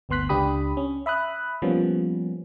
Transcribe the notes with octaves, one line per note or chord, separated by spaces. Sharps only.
G1 D2 B3 C6 F#6 B6
C#2 D4 G4 B5 D#6
C#4
E5 B5 D#6 F#6
F3 G3 A#3 B3 C#4